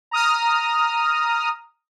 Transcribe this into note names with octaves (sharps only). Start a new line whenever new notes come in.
A#5 D#6 F6